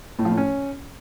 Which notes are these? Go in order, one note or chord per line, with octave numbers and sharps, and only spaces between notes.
A2
F3
A2
C#4